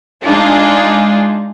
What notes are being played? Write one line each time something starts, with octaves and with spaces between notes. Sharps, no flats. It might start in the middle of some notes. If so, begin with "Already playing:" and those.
G#3 D4 D#4 F4 G#4